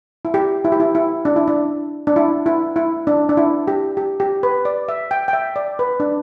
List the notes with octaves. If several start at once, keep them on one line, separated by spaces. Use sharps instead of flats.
E4
G4
E4
G4
E4
E4
D4
E4
D4
D4
E4
E4
E4
D4
D4
E4
G4
G4
G4
B4
D5
E5
G5
G5
E5
D5
B4
D4